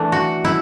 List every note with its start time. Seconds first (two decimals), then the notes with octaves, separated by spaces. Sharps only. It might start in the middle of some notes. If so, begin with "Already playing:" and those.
Already playing: E3 A3 D4
0.12 F#4
0.45 E4